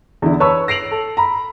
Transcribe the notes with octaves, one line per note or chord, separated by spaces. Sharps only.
E2 D3 E4
B4 C#5 A5 B5 C#6 E6
A#6 C7 D7 F7 F#7
A4
A#5 B5